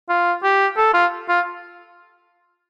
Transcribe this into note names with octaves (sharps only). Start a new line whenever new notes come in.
F4
G4
A4
F4
F4